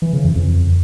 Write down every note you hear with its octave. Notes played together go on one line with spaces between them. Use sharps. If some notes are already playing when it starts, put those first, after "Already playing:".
E3
C#3
F2
F2